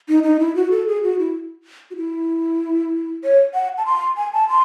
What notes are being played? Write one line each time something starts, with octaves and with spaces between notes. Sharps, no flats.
D#4
D#4
E4
F#4
A4
G#4
F#4
E4
F#4
E4
C#5
F#5
A5
C6
G#5
A5
C6